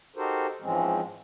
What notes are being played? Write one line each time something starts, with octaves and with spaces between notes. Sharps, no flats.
D#4 F#4 G4 A4 A#4 C5
G#2 E3 F3 G#3 C4 C#4